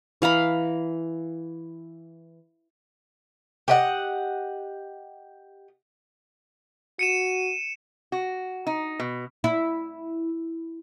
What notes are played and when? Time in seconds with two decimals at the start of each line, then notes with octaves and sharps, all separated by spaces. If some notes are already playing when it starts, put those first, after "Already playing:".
0.22 E3 F5 A#5 B5
3.68 G4 D#5 F#5
6.99 F#4 C#7 D#7 E7
8.12 F#4
8.67 D#4
9.00 B2
9.44 E4